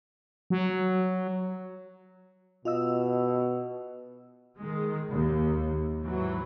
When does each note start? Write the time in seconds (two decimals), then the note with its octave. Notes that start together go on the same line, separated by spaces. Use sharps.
0.50 F#3
2.65 B2 F4 D#5 E6
4.58 D#3 G#3
5.12 D#2
6.00 G#2 E3 F#3